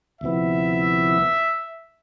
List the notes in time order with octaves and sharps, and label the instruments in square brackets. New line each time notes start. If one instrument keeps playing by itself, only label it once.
[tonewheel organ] D2 C3 F3 B3 E4 [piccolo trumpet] E5